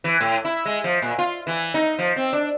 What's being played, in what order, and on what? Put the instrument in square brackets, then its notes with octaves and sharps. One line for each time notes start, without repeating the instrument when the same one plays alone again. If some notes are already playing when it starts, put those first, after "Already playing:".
[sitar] E3
A2
E4
G#3
F3
A#2
F4
E3
D#4
F3
C4
D4